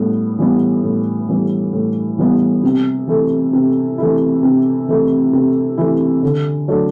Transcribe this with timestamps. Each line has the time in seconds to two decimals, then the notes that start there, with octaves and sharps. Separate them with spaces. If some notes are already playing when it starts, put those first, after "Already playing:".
Already playing: A2 G3 B3
0.39 E3 G3 B3
0.84 A2
1.29 E3 G3 B3
1.73 A2
2.18 E3 G3 B3
2.63 C3
3.07 E3 A3 E4
3.53 C3
3.98 E3 A3 E4
4.43 C3
4.88 E3 A3 E4
5.33 C3
5.78 E3 A3 E4
6.23 D3
6.68 F#3 A3 D4